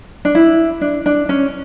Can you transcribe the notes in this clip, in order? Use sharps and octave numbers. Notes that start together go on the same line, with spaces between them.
D4
E4
D4
D4
C#4